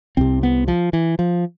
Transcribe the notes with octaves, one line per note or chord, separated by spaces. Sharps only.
C2 C3 C4
B3
F3
E3
F3